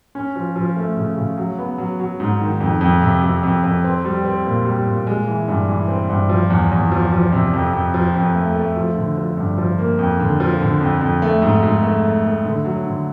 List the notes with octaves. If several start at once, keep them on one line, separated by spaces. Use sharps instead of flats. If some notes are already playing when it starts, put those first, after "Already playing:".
C#4
F3
F3
A3
C#3
C#3
F#3
B3
F#3
F#3
G#2
D#3
F2
F2
C3
F2
F2
F2
C4
G3
C4
A#2
G3
A#2
G#3
E3
G2
E3
C4
G2
F3
E2
E2
F3
F3
C3
F2
F2
F3
F2
A3
A3
F3
D3
F3
G2
F3
A#3
F2
D3
F3
D3
F2
F2
A3
G#2
G#2
A3
A3
A3
D3
F#3
D3